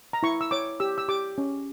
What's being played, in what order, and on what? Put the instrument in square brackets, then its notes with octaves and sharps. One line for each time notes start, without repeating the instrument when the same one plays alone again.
[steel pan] A#5
E4 C#6
E6
C#5 D6
G4 E6
E6
G4 D6
C#4